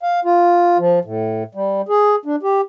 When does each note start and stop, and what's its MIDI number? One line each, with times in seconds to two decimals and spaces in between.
0.03 0.20 77
0.25 0.78 65
0.78 0.99 53
1.05 1.44 45
1.55 1.82 55
1.89 2.16 68
2.25 2.36 62
2.43 2.61 67